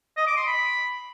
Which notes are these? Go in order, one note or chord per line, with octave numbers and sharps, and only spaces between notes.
D#5
D6
C6
B5